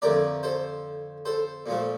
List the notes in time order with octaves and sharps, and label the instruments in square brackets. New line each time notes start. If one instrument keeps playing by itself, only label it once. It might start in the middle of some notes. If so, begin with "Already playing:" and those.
[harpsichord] F2 D3 A3 A#4 D5
A4 C5
A4 C5
A#2 F3 A3